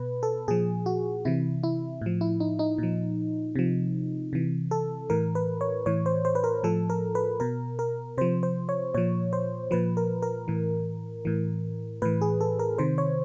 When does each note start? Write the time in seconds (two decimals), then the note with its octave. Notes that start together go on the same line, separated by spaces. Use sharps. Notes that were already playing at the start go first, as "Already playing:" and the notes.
Already playing: B2 B4
0.23 A4
0.48 A#2 F3 G#4
0.86 F#4
1.25 C3 E3 E4
1.63 E4
2.01 A2 F3
2.21 E4
2.40 D#4
2.59 D#4
2.78 A#2 F3
3.55 C3 F3
4.33 C3 E3
4.71 A4
5.10 A2 E3 A#4
5.35 B4
5.61 C#5
5.86 A2 E3 C#5
6.06 C5
6.25 C5
6.35 B4
6.44 A#4
6.63 A2 F3 A4
6.90 A#4
7.15 B4
7.40 B2 A#4
7.79 A#4
8.18 C3 F3 C5
8.43 C5
8.69 C#5
8.94 A#2 F3 C#5
9.33 C5
9.71 A#2 F3 B4
9.97 A#4
10.22 A#4
10.48 A2 E3
11.25 A2 E3
12.02 A2 E3 B4
12.21 G#4
12.41 A4
12.59 A#4
12.78 C3 D#3 C5
12.98 C#5